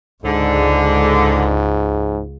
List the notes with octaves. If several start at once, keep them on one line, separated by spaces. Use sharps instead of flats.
C#2 G#2 D3